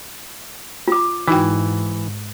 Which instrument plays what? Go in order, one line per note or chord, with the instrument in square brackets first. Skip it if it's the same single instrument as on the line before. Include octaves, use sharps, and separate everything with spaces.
[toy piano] F4 D6
[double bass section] G#2 [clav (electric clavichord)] E3 [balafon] D#4 F#4 G5